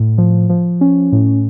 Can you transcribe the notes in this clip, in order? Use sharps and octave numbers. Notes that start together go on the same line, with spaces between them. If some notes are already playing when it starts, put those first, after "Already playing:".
Already playing: A2
F3
F3
C#4
A2